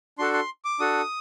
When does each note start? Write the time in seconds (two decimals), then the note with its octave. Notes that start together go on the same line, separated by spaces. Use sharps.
0.19 D4 F#4 A4 C6
0.34 C6
0.65 D6
0.80 D4 F#4 A4 D#6